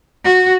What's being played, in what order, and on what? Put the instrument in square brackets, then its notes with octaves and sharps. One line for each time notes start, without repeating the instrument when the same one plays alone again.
[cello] F#4